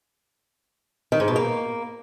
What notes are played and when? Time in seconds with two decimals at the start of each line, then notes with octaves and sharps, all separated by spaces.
1.12 D#3
1.20 G#2
1.28 B2
1.36 A#3